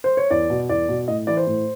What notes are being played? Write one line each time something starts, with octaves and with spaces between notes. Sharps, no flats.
C5
C#5
E2 D5
B2
E2 D5
B2
A2 D#5
E3 D5
C5
A2